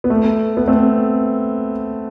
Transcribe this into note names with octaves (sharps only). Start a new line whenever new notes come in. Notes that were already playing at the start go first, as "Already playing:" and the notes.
B3
A3
B3
A3 C4